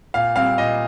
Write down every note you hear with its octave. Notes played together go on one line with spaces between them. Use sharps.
A#2 F5
G3 C4 F5
A#2 D#5